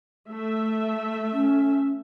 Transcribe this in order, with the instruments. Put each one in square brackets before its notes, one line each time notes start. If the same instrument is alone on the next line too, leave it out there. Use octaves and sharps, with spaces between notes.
[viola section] A3 E5
[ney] C#4